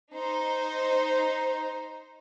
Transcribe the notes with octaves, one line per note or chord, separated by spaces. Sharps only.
D#4 C5